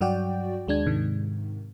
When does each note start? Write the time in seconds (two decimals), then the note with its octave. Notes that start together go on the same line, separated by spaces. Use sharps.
0.01 G2 F#3 F#4 D5 G5
0.67 D#2 G#3 D4 G#6
0.86 G#2 C3 D#3